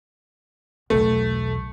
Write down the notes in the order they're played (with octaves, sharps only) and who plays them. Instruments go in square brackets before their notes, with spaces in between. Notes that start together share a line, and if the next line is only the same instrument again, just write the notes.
[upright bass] B1 E2 [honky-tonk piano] A3